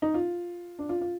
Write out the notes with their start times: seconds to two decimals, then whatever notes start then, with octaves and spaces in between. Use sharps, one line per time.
0.02 D#4
0.14 F4
0.79 D4
0.89 F4
1.01 F4